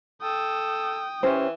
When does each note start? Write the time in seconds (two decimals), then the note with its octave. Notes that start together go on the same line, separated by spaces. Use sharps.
0.22 A4 G5 D#6
1.23 E3 C#4 G4 C5